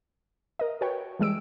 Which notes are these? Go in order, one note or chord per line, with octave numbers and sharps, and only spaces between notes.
A#4 D#5
F#4 B4 C#5 G5
E3 G3 G#3 E6 D7